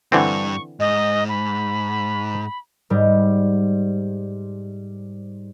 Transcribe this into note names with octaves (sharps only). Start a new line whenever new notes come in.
G2 D3 E3 C4 C#6
G#2 D#5
B5
G#2 G3